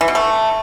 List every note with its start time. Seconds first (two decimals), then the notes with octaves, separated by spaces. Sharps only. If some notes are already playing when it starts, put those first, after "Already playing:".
0.01 E3
0.08 B2
0.15 A3